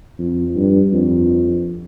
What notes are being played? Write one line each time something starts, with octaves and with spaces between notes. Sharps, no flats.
F2
G2
F2